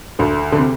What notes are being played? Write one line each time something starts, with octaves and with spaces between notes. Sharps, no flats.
D2 D3
D3
C3